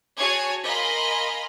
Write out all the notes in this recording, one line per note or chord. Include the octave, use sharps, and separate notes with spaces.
F#4 G#4 C#5 G#5 A5 G#6
A#4 D#5 F5 G#5 B5 C6